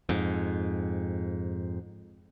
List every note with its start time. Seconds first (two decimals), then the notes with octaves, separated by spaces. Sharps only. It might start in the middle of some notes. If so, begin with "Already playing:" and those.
0.09 F2 G#2